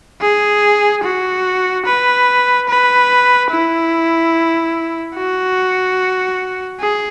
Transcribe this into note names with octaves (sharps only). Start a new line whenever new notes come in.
G#4
F#4
B4
B4
E4
F#4
G#4